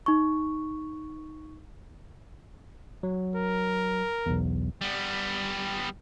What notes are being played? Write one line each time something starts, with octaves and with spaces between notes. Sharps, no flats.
D#4 C#6
F#3
A#4
B1 E2
G3 B3